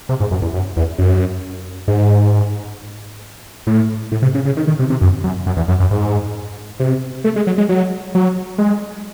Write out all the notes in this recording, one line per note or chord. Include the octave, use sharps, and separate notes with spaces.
C3
G#2
F#2
E2
F#2
E2
F#2
G#2
A2
A2
C3
C#3
C#3
D#3
D#3
C3
C3
F#2
F#2
F#2
E2
F#2
F#2
G#2
C3
A3
G#3
F#3
G#3
F#3
F#3
G#3